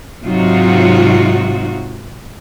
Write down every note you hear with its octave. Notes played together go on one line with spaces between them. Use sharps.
G#2 C3 F#3 D#4 F4 F#4